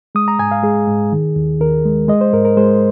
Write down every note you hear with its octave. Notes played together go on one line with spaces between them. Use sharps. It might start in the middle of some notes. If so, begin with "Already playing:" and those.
G#3 D#6
A#5
G#2 G#5
F5
G#3 G#4
G#2
D#3
D#2
D#2 A#4
G#3
G#3 D#5
C5
G#2 A#4
A#4
G#3 C5